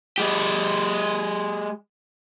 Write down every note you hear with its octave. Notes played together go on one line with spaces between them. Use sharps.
G#3 G4